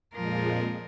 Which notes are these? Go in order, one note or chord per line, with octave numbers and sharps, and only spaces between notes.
F2 A#2 F3 G#3 A#4